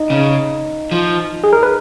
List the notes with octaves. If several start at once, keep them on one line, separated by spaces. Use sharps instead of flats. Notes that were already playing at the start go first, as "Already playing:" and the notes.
Already playing: D#4 D#5
C#3
F3
G#4
A#4
B4